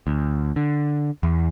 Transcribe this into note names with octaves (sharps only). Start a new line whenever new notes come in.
D2
D3
E2